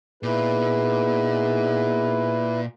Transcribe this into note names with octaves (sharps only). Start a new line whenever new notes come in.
A#2 B3 D#4 E4 G#4 B4